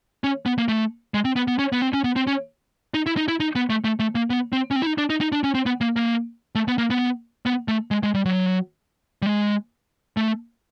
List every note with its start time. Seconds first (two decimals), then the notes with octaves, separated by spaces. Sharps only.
0.24 C#4
0.46 B3
0.58 A#3
0.68 A3
1.14 G#3
1.25 C4
1.36 B3
1.48 B3
1.59 C#4
1.72 B3
1.82 C4
1.93 C#4
2.04 B3
2.16 C4
2.27 C#4
2.94 D#4
3.06 E4
3.17 D#4
3.28 E4
3.40 D#4
3.55 B3
3.70 A3
3.84 A3
4.00 A3
4.15 A#3
4.30 B3
4.53 C4
4.71 C#4
4.76 C4
4.82 E4
4.86 D#4
4.98 D4
5.10 D#4
5.21 D#4
5.32 D4
5.44 C#4
5.54 C4
5.66 B3
5.81 A#3
5.96 A#3
6.55 A3
6.68 B3
6.78 A#3
6.90 B3
7.46 B3
7.68 A3
7.91 G#3
8.03 G#3
8.14 G3
8.25 F#3
9.22 G3
9.27 G#3
10.17 A3